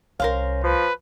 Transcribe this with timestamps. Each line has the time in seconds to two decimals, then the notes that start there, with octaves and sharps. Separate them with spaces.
0.20 C2 C#4 A#4 C5 F5
0.64 F3 B4